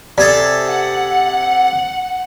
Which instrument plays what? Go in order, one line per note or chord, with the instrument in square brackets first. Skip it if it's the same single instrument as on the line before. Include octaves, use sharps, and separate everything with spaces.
[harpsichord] C3 G#4 A4 [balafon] D5
[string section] F#5